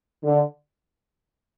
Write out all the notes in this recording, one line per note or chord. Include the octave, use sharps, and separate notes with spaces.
D3